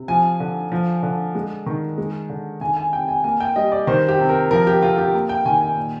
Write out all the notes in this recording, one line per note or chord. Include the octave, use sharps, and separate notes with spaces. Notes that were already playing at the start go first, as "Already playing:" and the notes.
Already playing: C3
F3 G#5
D3
F3
D3
G#3
D#3
G#3
D3
D#3 G#5
G#5
C3 G5
G#5
A#3 G#5
G5
G3 D#5
D5
D#3 C5
G4
C3
A#4
F3 A#4
G4
D3 F4
G4
A#3
G5
D#3 G#5
G#5
A#2